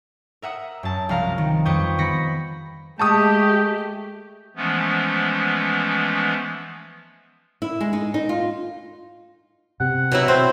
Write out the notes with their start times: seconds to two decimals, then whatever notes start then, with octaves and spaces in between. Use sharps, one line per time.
0.42 A#4 E5 F#5 D#6
0.83 F#2 A5
1.09 C2 F3 F5 A#5 F6
1.38 D#3
1.65 F2 G3 B4 C#6 D#6 G6
1.98 D#3 B3 B5 A#6 C#7
2.99 G#3 A3 G4 G5 A5 C#6 D#6
4.56 E3 F3 G#3 A3 B3 C#4
7.62 E4
7.81 G#3
7.93 D#4
8.14 D#4
8.29 F4
9.80 C3 F#5
10.12 B2 F#3 E4
10.28 C4 C5